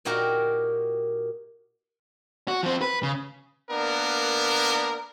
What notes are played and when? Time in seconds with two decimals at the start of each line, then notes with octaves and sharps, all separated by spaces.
0.05 A#2 D#4 F#4 G4 A#4
2.48 F#4
2.63 F3 C4
2.81 B4
3.03 C#3
3.70 A#3 B3 D4 A#4